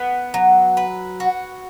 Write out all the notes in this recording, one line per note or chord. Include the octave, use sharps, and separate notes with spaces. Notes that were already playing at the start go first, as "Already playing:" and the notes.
Already playing: B3
F#3
B4
F#4